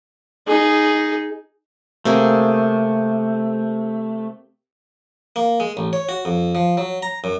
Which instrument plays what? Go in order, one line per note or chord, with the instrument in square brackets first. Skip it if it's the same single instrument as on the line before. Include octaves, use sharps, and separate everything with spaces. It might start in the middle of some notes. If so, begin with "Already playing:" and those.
[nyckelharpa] D#4 G#4
[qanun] C3 A#3 G#4 [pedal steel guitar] A3
[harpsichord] A#3
G#3
A1
C#5
F#4
F2
F3
F#3
A#5
F#2